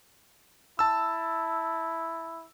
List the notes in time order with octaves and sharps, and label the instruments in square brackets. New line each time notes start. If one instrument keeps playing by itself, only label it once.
[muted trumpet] E4 [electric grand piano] A5 E6